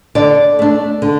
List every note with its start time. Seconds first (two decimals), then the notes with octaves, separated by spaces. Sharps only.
0.15 D3 D5
0.59 A3 D4
1.02 D3